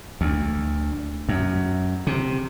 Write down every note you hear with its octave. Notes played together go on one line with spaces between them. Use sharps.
D2
F#2
C3